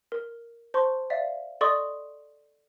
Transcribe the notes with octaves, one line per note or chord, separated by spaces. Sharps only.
A#4
C5 A5 C6 C#6
D5 E5 F5
A4 D5 D#5 C6 C#6 D#6